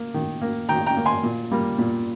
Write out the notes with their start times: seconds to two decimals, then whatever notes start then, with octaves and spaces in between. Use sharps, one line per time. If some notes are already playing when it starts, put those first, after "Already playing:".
Already playing: A#3
0.14 D#3
0.42 A#3
0.69 D#3 G5 A#5
0.86 G5 A#5
0.97 A#3
1.06 G#5 C6
1.23 A#2
1.51 G3 A#3
1.78 A#2